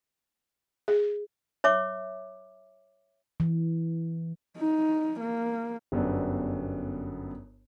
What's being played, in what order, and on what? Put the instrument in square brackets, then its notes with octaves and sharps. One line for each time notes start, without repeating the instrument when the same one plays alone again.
[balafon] G#4
[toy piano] C#5 E5 D6
[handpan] E3
[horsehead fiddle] D#4
A#3
[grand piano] G1 F#2 B3 D4